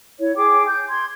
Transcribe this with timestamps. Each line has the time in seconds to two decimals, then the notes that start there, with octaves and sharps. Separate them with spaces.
0.19 E4 C#5
0.36 G#4 G5 D6
0.66 G6
0.89 C6 G#6